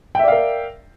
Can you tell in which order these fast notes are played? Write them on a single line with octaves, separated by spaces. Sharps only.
G5 E5 D5 F5 A#4